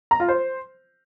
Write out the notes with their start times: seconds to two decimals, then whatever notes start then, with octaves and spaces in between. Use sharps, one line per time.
0.11 A#5
0.20 F4
0.28 C5